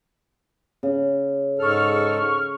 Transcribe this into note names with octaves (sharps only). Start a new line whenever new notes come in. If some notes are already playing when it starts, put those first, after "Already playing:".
C#3
G#2 A4 C#6 F6